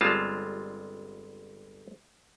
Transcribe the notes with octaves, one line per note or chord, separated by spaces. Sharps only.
G1 G3 G#3 C4 F4 A5